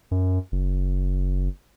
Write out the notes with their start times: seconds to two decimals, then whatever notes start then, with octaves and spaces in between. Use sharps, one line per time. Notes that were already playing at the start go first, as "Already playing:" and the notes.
0.11 F#2
0.52 F#1